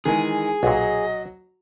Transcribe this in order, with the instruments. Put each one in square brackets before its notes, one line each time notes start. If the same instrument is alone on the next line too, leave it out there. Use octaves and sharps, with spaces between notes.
[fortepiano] D#3 E3 G#3 [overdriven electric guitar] G#4 [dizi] G#5
[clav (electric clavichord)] B1 A#2 [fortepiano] F#3 F#4 [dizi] D#5